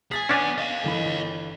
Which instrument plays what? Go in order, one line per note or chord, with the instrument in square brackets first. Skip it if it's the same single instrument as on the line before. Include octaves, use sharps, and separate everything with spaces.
[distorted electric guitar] G#4 G#5 [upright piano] A6 B6
[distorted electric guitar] B3 G#5 [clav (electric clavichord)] C#4 D4
[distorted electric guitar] D#5 F5
[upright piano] G1 E3 B5